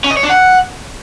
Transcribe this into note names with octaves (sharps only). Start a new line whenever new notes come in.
C#4
D#5
C#5
D4
F#5